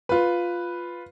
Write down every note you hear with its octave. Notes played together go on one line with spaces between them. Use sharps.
F4 B4